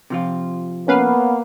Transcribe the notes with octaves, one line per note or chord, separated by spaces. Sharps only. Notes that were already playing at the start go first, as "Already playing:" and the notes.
C3 F3 F4
A#3 B3 C#4 B4 F5